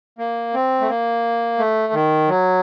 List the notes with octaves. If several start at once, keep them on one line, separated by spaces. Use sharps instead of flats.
A#3
C4
A3
A#3
A3
D#3
F#3